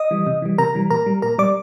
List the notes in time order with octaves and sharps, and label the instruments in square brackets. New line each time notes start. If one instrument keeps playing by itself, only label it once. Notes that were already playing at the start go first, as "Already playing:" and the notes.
Already playing: [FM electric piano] D#5 D#6
E3 G3
C3
E3 G3
C3 A#4 A#5
E3 G3
A#2 A#4 A#5
G3
A#2 A#4 A#5
G3 D5 D6